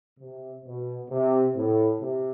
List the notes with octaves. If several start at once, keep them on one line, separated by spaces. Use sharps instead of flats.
C3
B2
C3
A2
C3